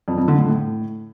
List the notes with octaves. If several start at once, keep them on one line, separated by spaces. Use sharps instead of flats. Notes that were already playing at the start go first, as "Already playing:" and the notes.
F2
F2
D3
A2
A2